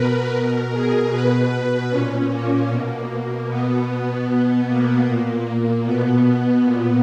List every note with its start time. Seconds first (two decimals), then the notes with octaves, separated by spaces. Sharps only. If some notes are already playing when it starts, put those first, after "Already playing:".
Already playing: B2 A#4 B4
0.34 B2
0.73 G#4
1.11 B2 B4
1.52 B4
1.90 A#2 C#4
2.31 A#3
2.70 B2
3.48 B2 B3
4.27 B2
4.67 A#3
5.06 A#2 A#3
5.85 B2 B3
6.64 A#2 B3